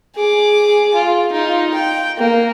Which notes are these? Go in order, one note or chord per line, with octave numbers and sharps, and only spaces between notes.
G#4 D6
F4
D#4 F4
G5
A#3